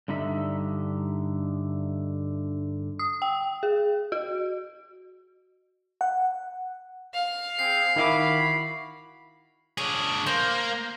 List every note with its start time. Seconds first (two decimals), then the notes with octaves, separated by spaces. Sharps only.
0.08 G2 D3 D#4 E5
2.99 D#6
3.22 G5
3.63 G#4
4.12 F#4
6.01 F#5
7.14 F5
7.59 C4 G#4 C7
7.96 D#3 E4 F#4 B5 D6
9.78 D4 G#4 C#5
10.27 A#3 C5